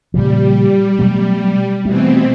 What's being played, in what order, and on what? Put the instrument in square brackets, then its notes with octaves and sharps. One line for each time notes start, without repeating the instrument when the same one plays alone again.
[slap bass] A#2 C#3 F3 [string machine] G3
[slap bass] B2 F#3 A3
[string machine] B2 E3 C4 [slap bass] A3